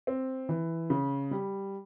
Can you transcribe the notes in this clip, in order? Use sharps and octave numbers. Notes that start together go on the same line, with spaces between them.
C4
E3
C#3
G3